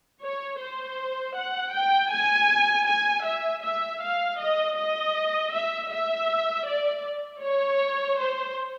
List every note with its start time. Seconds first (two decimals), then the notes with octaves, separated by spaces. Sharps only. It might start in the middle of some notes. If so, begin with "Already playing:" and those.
0.21 C#5
0.60 C5
1.35 F#5
1.73 G5
2.11 G#5
2.87 G#5
3.25 E5
3.63 E5
4.01 F5
4.39 D#5
4.77 D#5
5.53 E5
5.90 E5
6.66 D5
7.42 C#5
8.19 C5